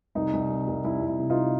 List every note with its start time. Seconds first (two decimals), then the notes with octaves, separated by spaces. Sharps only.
0.15 C2 D#4
0.33 C2
0.50 C3
0.67 C2
0.84 C2 E4
1.02 C2
1.07 E4
1.19 C3
1.30 D#4 F4